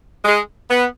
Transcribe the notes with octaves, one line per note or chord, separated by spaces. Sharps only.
G#3
B3